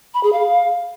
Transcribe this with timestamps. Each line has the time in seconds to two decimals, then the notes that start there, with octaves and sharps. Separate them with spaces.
0.14 B5
0.23 G#4
0.33 F5